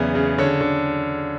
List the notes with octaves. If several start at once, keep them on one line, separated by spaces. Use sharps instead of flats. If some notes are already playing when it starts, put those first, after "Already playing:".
Already playing: E2 C#3 F#3 B3 D5 E5
C#3
D3 C#5
D3